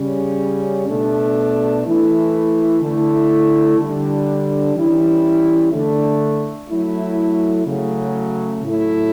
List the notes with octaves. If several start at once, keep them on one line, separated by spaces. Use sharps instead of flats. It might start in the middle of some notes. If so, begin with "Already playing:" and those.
Already playing: C#3 G3 C#4
B2 A3 D4
E3 A3 E4
D3 A3 E4
D3 G3 D4
E3 G3 C#4 E4
D3 A3 D4
F#3 A3 E4
C#3 F#3 A3
A2 F#3 A3 E4